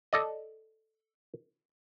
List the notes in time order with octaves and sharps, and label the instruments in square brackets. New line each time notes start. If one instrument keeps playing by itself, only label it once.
[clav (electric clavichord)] A4 D5 D#5